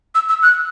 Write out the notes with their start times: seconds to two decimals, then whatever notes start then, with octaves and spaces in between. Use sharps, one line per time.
0.15 E6
0.29 E6
0.43 F#6